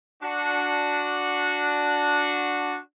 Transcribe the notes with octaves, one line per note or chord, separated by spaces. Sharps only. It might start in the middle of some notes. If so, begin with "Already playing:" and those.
D4 F#4